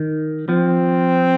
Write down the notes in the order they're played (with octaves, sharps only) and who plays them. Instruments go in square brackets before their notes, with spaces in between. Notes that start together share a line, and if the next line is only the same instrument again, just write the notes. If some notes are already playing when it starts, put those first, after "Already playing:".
Already playing: [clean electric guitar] D#3
[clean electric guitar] F3 [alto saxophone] C4